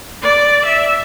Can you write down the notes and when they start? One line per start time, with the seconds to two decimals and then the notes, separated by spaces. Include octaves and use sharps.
0.23 D5
0.66 E5